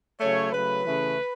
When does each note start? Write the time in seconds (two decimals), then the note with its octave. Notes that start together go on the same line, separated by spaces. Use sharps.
0.20 C#3 F#3 A3 C#5
0.52 C#3 F#3 A3 B4
0.84 C#3 E3 A3